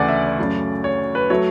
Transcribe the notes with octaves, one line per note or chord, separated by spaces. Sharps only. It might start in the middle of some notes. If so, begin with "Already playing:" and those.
Already playing: D2 C#3 E3 A3 D5 F#5 G#5
E5
D5
F#2 C#3 F#3 A3
C#5
B4
F#3 A3 C#5